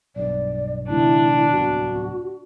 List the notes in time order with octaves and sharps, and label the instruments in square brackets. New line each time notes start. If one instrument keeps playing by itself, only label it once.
[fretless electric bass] B1 G2 [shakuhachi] D5
[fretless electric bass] C#2 B2 D#3 [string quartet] D4 [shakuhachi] E4
[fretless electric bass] D1 C2 B3 [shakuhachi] F#4